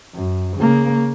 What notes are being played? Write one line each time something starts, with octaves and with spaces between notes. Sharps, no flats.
F#2
C#3 A#3